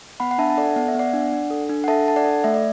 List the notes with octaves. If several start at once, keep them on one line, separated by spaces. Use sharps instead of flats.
B3 F#5 B5
F#5
D4 E5 A5
A5
A4 D5 F#5
B3 F#5
E5
B3 D5 F#5
D4
D4
A4
D4
F#5
A4 E5 A5
D4 A5
D5 F#5
A4
A3 E5
D5